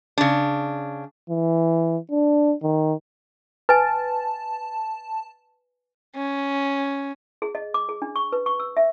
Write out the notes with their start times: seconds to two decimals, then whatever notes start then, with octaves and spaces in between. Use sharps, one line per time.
0.18 C#3 D4
1.30 E3
2.11 D4
2.63 D#3
3.69 B4 G#5 A5
6.16 C#4
7.42 G#4
7.55 D#5
7.74 D6
7.89 G#4
8.02 D4
8.16 C#6
8.32 B4
8.46 C#6
8.60 E6
8.77 E5